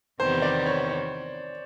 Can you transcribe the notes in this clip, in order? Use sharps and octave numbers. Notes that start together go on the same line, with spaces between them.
E2 C3 D#3 G3 B3 C5
D5
C#5
C#5